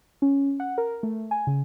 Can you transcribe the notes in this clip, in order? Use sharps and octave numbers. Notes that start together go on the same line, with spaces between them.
C#4
F#5
A#4
A3
G#5
C#3